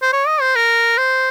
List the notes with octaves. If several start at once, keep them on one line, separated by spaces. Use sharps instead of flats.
C5
C#5
D#5
C5
A#4
C5